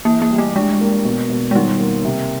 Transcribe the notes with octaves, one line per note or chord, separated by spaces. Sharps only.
E3 A#3
A#3
G3
A3
G#3 D4
A#3
B2
B2
G#3
D#3 G3
A#3
C3